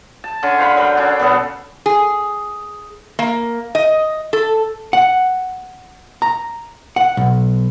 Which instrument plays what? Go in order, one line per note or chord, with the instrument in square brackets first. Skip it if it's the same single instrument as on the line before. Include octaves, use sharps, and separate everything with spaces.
[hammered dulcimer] A5
D3 C#4 D4
C5 F5 F#5 B5
F#3 G3 A#4
F#3 C#4 D4
B2 F#3 B3 A4
[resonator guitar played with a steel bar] G#4
A#3
D#5
A4
[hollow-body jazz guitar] F#5
A#5
F#5
B1